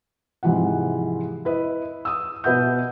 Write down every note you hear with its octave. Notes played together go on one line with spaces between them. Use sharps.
G#2 C3 E3 F3 F#5
E4 B4 D#5
D#6 E6
B2 B4 E5 F#5 G6